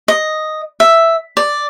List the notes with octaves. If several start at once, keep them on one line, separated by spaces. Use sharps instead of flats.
D#5
E5
D5